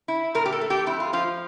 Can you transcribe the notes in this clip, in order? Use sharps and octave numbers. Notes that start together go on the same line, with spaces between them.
E4
A#2 A#4
G4
A4
A3
G4
F2 E4
F4
F3 F4